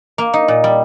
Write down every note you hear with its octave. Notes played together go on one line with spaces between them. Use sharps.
A#3
D#4
A#2
G3